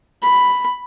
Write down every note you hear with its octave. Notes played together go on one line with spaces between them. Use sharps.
B5